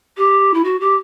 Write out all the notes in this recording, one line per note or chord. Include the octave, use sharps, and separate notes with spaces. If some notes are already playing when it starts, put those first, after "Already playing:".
G4
E4
F#4
G4